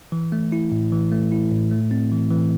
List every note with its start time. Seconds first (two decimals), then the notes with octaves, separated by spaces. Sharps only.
0.12 E3
0.32 A3
0.52 E4
0.72 A2
0.92 E3
1.12 A3
1.32 E4
1.52 A2
1.71 A3
1.91 C4
2.12 E3
2.31 E3